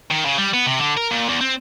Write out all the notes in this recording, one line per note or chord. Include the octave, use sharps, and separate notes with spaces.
D#3
C#3
G3
B3
C3
D3
A#4
A#2
E2
C4